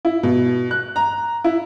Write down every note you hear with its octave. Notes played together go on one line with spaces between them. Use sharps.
E4
B2
F#6
A#5
E4